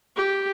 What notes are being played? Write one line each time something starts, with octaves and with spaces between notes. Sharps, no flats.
G4